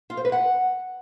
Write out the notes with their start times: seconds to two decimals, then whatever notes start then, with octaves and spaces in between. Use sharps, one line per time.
0.10 F4
0.17 C5
0.25 B4
0.32 F#5